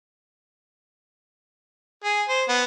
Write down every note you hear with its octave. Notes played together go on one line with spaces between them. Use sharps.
G#4
C5
B3